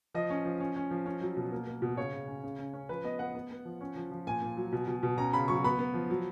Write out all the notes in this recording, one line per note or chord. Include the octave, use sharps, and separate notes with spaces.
F3 D#5
C#4
F3
C#4
C#4
F3
C#4
F#3
B2
A#3
A#3
B2
C#3 C#5
C#3
C#4
C#3
C#4
C#4
F3 B4
B3 D#5
B3 F#5
B3
B3
F3
C#4
F3
F3
A#2 G#5
A#2
F#3
B2
B2
B2
C#4 A#5
C#3 B5
F#3 C#6
B3 B5
B3
F3
F#3